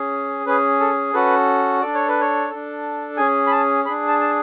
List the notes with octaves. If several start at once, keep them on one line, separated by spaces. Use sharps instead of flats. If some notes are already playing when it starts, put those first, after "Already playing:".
Already playing: C#4 G#4
C#4 G#4 B4
A4
C#4 F#4 A4 B4
D4 A4 D5
C#5
B4
C#5
D4 A4
C#4 G#4 G#5
B5
A5
D4 G#4 B5
A5
A5